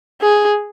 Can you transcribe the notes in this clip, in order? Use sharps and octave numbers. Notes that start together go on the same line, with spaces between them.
G#4